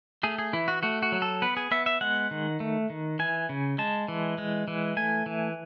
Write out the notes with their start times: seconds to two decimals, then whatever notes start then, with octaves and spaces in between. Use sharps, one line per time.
0.23 A3 G#4
0.39 G#4
0.53 E3 E4
0.68 F#4
0.83 A3 F#4
1.02 F#4
1.12 F#3
1.22 A4
1.42 B3 B4
1.57 G#4
1.71 B3 E5
1.86 E5
2.01 G#3 F#5
2.31 D#3
2.60 A3
2.90 D#3
3.19 E3 G#5
3.49 C#3
3.78 G#3 A5
4.08 E3
4.38 G#3
4.68 E3
4.97 A3 G#5
5.26 E3